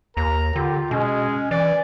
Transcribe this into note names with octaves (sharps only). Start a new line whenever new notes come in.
D#2 A#4 A#5
D3 F4 G4
B2 G#3 C#4
E3 D5 G#5